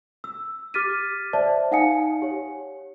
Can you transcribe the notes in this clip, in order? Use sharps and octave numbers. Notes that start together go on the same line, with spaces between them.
E6
G4 D6 F6 A6 B6 D#7
C5 D5 E5 A5
D#4 F5 F#5 G#5 D#6 C#7
G4 C#5